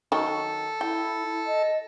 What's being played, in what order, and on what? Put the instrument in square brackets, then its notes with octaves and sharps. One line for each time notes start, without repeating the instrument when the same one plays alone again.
[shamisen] D#3 F#3 [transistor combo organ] A4
[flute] E4 [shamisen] G5
[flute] D#5